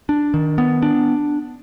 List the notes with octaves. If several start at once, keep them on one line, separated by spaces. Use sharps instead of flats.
D4
D#3
B3
D4